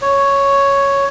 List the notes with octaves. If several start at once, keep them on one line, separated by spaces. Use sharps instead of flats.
C#5